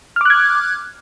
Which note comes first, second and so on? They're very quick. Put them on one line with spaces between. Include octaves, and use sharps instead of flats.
F6 D6 F#6 G#6